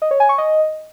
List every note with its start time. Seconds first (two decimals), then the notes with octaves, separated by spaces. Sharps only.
0.02 D#5
0.11 C#5
0.20 G#5
0.29 C#6
0.38 D#5